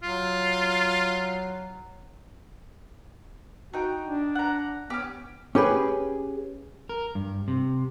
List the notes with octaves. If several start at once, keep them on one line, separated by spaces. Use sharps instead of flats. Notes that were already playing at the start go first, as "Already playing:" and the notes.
F#3 F4
D#4 F#4 G5
D4
F#5 A#5
B3 C#4 G4
C#4 G4 G#4 B4
A#4
G2
C3